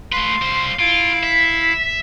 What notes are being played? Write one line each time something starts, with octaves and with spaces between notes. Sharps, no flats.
A3 B4 F5 C6
G3 C5
E4 F4 F5 D7
E5 B6